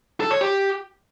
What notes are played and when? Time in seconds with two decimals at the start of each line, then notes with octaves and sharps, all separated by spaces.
0.20 A4
0.31 C#5
0.41 G4